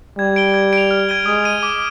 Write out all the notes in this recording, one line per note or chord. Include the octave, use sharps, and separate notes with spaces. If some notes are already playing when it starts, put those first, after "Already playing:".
G3 G#6
D7 G7
G#6
D7 F7
F6
G#6 D#7 G7
G#3 D#6
G#6 D#7
D6